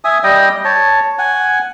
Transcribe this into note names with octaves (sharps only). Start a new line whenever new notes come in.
E5 G#5 D#6
G3 D#5 G5 D#6
C#5 A5
F#5 G#5